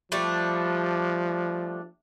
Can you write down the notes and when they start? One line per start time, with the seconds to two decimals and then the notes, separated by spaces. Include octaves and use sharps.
0.12 F3 G3 A3 D4